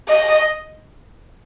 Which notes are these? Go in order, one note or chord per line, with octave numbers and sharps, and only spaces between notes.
D#5